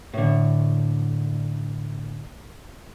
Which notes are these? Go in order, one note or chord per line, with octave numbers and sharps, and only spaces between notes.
A2 D3